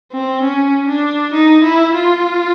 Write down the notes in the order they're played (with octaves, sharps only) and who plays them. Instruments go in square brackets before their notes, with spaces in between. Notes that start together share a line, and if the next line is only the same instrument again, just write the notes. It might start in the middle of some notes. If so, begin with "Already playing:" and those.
[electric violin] C4
C#4
D4
D#4
E4
F4